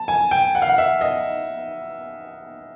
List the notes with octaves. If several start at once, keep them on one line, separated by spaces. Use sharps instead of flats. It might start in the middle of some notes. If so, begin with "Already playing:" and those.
Already playing: A5
G#5
G5
F#5
F5
F#5
E5
D#5